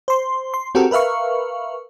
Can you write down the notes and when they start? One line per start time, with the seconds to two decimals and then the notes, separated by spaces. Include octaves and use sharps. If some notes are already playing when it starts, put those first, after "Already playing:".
0.08 C5 C6
0.54 C6
0.75 C4 F#4 G4 A4 A#4
0.91 A#4 B4 E5 F5 C#6